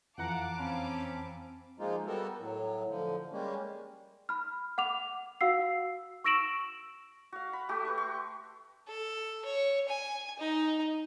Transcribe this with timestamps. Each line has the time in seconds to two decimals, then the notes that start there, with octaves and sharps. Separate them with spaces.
0.18 F2 E3 F5 F#5 A5 A#5 D6
0.58 C4 C#4 B5
1.79 F3 G#3 A#3 D#4 F4
2.06 G3 A#3 B3 F#4 A4 A#4
2.39 A2 F#3
2.89 D3 F3
3.32 G3 G#3 A#3 C#4
4.29 B5 F6
4.78 F#5 D6 F7
5.41 F#4 F5 F#5 E6 C7
6.24 C#6 E6 A#6 D7 E7 F#7
7.32 F#4 F5
7.53 B5
7.69 A3 F#4 G4
7.85 B4 C#6
7.98 C6 C#6
8.88 A4
9.45 C#5
9.88 G#5
10.39 D#4